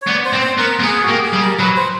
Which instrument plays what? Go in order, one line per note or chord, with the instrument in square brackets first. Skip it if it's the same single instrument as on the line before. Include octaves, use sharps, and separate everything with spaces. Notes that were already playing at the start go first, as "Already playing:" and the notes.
[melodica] C#5
[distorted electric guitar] B3 [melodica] D5
[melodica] C5
[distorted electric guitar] C4
[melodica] C5
[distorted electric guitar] B3 [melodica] A#4
[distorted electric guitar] A#3
[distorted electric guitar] B3 [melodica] G#4
[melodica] F#4
[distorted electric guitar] A#3 [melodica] G4
[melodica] G#4
[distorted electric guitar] G3
[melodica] A#4
[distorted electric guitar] F#3 [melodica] B4
[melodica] C5